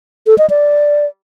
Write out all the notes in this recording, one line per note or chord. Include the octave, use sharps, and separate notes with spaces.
A4
D#5
D5